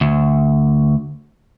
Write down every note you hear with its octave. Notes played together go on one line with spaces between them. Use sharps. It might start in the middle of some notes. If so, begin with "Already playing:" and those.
D2